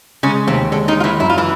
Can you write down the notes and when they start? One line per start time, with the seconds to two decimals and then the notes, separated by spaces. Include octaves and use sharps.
0.23 C#3 G#3 C#4
0.47 D#2 C3 C4
0.72 D3 G#3 D4
0.88 D#3 D#4
0.96 G#3 F4
1.04 E3 E4
1.20 F#2 E4
1.29 F4
1.38 E3 E4